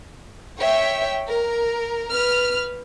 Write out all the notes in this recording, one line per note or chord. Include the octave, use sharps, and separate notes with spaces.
C#5 E5 G5
A#4
B4 F6